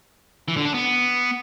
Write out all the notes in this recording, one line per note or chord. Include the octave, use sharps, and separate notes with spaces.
E3
D3
D4
B3